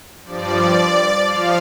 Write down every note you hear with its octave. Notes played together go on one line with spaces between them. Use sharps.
G2 F3 D5
F3 F5